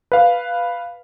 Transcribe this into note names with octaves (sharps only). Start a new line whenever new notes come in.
B4 F5